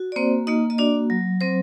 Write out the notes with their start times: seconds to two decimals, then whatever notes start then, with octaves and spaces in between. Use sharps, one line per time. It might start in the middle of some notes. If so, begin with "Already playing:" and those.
Already playing: F#4
0.12 D5
0.16 A#3 C4 C5
0.47 A#3 D#4 D#5
0.70 D#5
0.78 D4 F#4 D5
1.10 F#3
1.41 F#3 C4 C5